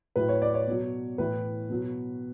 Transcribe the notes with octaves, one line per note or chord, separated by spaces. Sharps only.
A2 F#3 B4
C#5
D5
C#5
B2 F#3
A2 E3 B4
B2 F#3